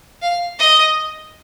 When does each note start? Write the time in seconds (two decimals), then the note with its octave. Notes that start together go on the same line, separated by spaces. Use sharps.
0.22 F5
0.59 D#5